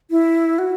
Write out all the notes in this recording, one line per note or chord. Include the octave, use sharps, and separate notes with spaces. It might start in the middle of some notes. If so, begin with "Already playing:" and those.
E4
F#4